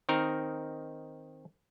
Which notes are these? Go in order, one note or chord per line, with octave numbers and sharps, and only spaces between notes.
D#3 C4 D#4 A#4